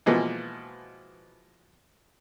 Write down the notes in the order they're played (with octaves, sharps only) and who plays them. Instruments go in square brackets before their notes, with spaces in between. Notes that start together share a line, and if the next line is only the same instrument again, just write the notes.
[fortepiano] B2 E3 F3 G#3 A#3